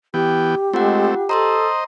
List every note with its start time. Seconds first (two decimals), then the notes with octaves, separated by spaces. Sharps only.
0.14 E3 B3 G4 G5
0.74 G#3 A3 C4 F4 F#5
1.29 A4 C5 D#5 A#5 C6 D#6